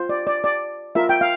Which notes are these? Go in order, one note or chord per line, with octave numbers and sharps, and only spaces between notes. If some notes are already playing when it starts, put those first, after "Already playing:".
Already playing: F4 C5
D5
D5
D5
F4 A#4 E5
G5
F5